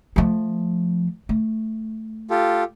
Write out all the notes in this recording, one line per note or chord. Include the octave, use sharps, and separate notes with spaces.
F3 A3
A3
F4 G4 A4